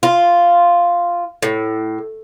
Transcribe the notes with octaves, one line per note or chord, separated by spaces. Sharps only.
F4
A2